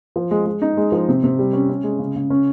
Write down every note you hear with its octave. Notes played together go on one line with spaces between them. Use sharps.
F3
G#3
G#3
D#4
G#3
F3
C3
C3
G3
C#4
C#4
G#3
C#3
C#3
C#4